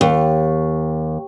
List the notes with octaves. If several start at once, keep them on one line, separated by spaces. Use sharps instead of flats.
D#2